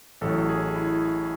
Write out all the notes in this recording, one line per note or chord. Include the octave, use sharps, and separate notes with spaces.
A1 A2 F#3 A4
G#4
E4